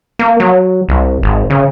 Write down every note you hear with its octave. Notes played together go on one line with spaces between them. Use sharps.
A#3
F#3
C2
G#1
C#3